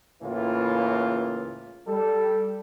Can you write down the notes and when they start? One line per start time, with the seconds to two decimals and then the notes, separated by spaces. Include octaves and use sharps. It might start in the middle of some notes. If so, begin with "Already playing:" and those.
0.23 C#2 A2 C#3 E3 A#3 F4
1.88 G3 A4